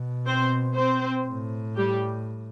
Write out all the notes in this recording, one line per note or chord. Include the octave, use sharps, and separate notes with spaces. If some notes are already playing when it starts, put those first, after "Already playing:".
Already playing: B2
C4 C5
C4 C5
A2
G3 G4